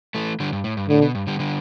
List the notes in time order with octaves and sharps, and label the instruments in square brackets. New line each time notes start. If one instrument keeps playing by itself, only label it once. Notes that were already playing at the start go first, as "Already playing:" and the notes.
[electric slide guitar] E3 A3
D3 G3
G2
A2
G2
[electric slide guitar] A2 [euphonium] D3
[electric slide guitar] B2
G2
D3 G3
D3 G3